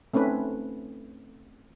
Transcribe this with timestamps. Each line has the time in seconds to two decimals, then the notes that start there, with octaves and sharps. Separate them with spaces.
0.14 A3 C4 C#4 D#4 B4